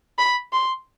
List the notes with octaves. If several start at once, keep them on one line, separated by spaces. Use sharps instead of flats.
B5
C6